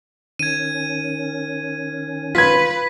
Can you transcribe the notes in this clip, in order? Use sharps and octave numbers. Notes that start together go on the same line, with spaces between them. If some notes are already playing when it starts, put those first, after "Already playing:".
D#3 C#4 G#6 D#7
F4 B4 G#6 B6